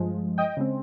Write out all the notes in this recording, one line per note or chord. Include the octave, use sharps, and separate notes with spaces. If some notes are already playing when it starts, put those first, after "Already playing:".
Already playing: G2 F3 G#3
D#5 G5
C#3 G#3 C4